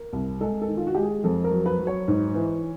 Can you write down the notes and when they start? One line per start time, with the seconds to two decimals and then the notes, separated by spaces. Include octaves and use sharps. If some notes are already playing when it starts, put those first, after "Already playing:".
Already playing: A#4
0.13 C2
0.41 G#3 A4
0.62 A4
0.68 D#3
0.77 F4
0.87 F#4
0.95 G#3 G4
1.03 G#4
1.24 F2 A4
1.44 A#4
1.51 F#3
1.66 B4
1.79 F#3
1.87 C#5
2.08 G#2
2.35 E3